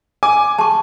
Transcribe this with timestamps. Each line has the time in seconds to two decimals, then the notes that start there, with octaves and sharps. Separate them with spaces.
0.23 G#5 D6
0.59 A5 C#6